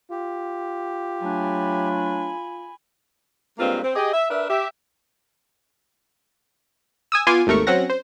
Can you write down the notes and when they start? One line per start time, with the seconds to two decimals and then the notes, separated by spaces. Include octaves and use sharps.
0.11 F4 G4
1.22 F#3 A3 D4 G#5 B5
3.59 G2 G#3 A#3 C4 F4 B4
3.84 C4
3.95 G4 G#4 D#5
4.12 E5
4.30 D4 A#4 B4 E5
4.49 G4 E5
7.12 G#5 D#6 E6
7.27 B3 F4 G#5 C6 D6 D#7
7.47 G#1 D#2 A3 A#4 C#6
7.67 F#3 C4 C#4 F#5 A#6
7.90 C5